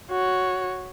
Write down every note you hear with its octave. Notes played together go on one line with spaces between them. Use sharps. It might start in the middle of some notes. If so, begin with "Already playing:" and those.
F#4 C#5